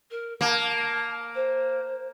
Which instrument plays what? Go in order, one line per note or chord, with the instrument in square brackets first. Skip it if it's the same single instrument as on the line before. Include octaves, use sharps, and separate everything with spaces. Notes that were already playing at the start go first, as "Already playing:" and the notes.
[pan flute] A#4
[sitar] A#3 [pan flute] A5
[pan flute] C5